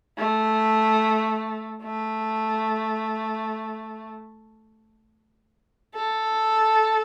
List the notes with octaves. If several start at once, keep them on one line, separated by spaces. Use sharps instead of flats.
A3
A3
A4